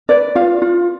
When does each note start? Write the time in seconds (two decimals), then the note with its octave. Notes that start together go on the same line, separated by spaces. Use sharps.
0.09 B4 D5
0.35 F4 F5
0.62 F4